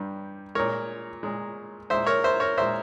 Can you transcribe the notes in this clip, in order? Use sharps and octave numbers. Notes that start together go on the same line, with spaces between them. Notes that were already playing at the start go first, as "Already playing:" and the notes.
Already playing: G2 G3
A#2 G#3 A#4 C#5
A#2 G#3
A#2 G#3 C5 E5
A#4 C#5
C5 E5
A#4 C#5
A#2 G#3 C5 E5